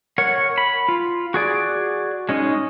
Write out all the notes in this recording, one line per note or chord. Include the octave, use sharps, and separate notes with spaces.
A#4 C#5 F#5
B5
F4
F#4 G#4 D5
G#3 C#4 D#4